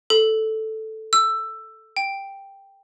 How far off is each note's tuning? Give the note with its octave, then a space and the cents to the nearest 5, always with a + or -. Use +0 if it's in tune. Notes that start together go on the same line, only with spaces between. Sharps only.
A4 +0
E6 +10
G5 +0